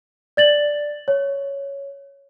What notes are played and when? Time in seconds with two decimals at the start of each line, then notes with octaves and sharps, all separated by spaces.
0.37 D5 A6 F#7
1.08 C#5